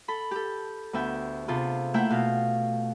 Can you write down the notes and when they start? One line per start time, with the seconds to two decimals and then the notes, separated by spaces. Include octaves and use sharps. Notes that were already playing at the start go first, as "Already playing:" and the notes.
0.08 A4 B5
0.31 G4 A4
0.93 D2 B3 E5 G5
1.48 C3 B3 F4 G#4 A4
1.94 A3 A#3 E4 E5 F#5 G5
2.10 B2 F5